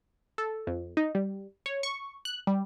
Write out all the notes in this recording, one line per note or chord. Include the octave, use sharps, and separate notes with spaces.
A4
F2
D#4
G3
C#5
C#6
F#6
G3